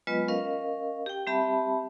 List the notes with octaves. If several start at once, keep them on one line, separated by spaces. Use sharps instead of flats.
F#3 G#3 B3 F4 B4 D#5
C#4 A#4 D#5 F5
G4 G5
G3 C4 G4 E5 A5 B5